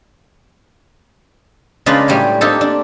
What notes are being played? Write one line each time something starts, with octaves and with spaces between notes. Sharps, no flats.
C#3 G#3 D4 F4 A#4 B4
A2 F#3 G3 G4 G#5
A#3 C4 D4 D#4 G4 A4
D4